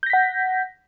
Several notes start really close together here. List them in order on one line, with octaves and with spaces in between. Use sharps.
G6 A#6 B6 F#5